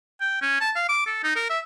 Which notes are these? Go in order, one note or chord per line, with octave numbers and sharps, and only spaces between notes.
G5
C#4
A5
F5
D6
A4
D#4
A#4
E5